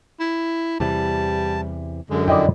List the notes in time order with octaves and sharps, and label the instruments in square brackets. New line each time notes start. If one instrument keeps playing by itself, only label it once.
[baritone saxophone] E4
[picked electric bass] E2 C3 E3 [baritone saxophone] G3 [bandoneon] A5
[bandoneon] F#2 D3 [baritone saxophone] G#3
[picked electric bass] F2 [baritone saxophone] E4 [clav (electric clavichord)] D5 D#5 G5